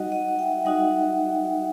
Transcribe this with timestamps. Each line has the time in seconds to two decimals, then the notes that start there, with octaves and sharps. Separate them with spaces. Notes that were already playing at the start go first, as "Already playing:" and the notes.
Already playing: G3 D#4 F#4 D#5 F#5
0.12 D#5 F#5
0.28 F#5
0.39 E5 G5
0.65 G3 D#4 F#4 D#5 F#5